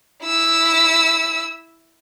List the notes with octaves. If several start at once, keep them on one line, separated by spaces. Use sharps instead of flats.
E4 E6